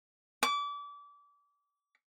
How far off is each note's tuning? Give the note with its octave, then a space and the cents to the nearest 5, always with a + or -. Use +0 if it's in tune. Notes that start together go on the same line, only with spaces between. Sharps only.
D6 -30